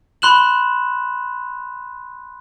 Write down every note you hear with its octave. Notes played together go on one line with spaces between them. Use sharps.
B5 C6 F#6 E7 F#7